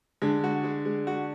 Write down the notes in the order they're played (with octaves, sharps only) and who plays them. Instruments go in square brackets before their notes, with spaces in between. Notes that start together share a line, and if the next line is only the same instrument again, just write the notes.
[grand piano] D3 [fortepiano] G#3
[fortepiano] F#4
G#3
G#3
F#4